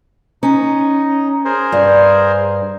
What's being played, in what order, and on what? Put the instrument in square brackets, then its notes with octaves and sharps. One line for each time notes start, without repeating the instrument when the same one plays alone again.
[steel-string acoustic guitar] C#4 [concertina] D#4
[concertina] G#4 A#4 C5
[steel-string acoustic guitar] G2